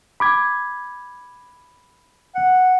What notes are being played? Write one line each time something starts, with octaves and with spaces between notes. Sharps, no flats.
B5 D6 G#6
F#5